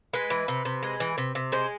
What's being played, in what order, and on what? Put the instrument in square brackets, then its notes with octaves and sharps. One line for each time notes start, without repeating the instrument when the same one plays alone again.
[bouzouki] G#3 B4
E3
C3
C3
G#3
E3
C3
C3
G#3 C5